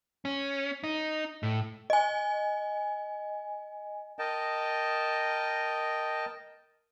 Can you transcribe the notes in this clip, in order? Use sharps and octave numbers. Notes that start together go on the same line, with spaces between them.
C#4
D#4
A2
D#5 G#5
A#4 D#5 G5 A5